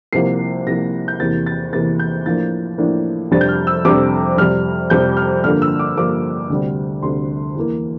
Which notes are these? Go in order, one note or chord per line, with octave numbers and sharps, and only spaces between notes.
C2 C3 F3 A#3 C7
C2 C3 F3 A#3 A#6
G6
E2 C3 E3 A#3 A6
A6
E2 C3 E3 A#3 A6
G6
A2 F3 A#3 D4 A6
A2 F3 A#3 D4
F2 C3 G3 D4 A6
G6
F6
E6
F2 C3 G3 D4 D6
F2 C3 G3 F6
F2 C3 G3 G6
F6
G2 D3 F3 A#3 F6
E6
D6
G2 D3 F3 A#3 D6
D2 C3 G3
D2 C3 G3 C6
E2 E3 A#3